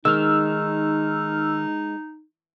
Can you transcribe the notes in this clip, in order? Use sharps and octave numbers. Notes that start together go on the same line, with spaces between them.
D#3 G#3 D#4 E6 F6